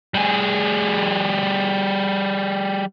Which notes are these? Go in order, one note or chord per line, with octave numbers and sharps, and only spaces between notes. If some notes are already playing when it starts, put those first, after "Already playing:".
G3 G#4